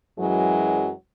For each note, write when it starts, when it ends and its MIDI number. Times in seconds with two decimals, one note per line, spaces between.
0.19 0.90 42
0.19 0.90 52
0.19 0.90 54
0.19 0.90 56